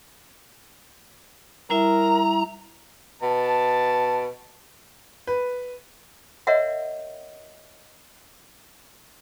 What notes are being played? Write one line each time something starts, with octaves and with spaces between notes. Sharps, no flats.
G3 E4 A#4 E5 A#5
B2 A5
B4
A#4 C#5 D#5 E5 F#5